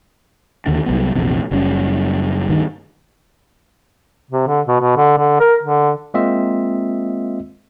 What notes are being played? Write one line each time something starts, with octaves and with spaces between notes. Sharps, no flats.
D#2 D3 D4
C2 F#3 B3
A#1 E2 C3 E3
F#1 F#2 G3 C#4
D2 G2 D#3
C3
D3
B2
B2
D3
D3
A#4
D3
G#3 A#3 C4 F4 D#5 E5